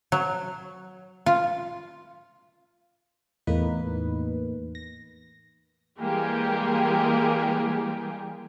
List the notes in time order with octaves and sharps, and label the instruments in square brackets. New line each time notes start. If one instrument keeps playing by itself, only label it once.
[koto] F#3
F4
[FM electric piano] E2 A2 A#3 D#4 B4
A#6
[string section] E3 G3 G#3 A#3 G4 G#4